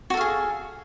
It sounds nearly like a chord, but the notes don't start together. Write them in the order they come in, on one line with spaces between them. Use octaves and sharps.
F#4 A4 F5 G#4